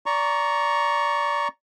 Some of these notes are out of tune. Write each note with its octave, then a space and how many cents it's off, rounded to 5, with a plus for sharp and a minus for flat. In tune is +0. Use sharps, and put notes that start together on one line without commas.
D5 -20 A#5 +0 C#6 +0